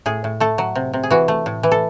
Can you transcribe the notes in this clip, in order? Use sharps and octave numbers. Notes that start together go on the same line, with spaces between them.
A2 G#4
A2
A3 A4
F#3
C3
C3
G#4
E3 F#4
A3
A2
E3
A4